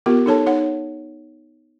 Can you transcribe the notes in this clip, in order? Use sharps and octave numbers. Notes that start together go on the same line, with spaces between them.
B3 F4 G4 A#4
D#4 A4 C#5 A5
D#4 C#5 F#5